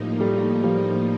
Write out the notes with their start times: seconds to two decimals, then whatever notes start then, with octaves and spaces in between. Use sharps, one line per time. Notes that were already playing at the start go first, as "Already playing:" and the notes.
Already playing: A2 F3 G3 A#3 D#4
0.19 G3 A3
0.63 F3 G3